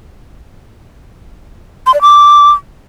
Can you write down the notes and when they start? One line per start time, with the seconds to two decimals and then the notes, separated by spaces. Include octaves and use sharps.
1.87 C6
1.94 D5
2.01 D6